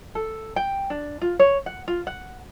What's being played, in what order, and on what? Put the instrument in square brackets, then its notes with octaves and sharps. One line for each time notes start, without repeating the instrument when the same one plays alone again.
[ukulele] A4
G5
D4
F4
C#5
F#5
F4
F#5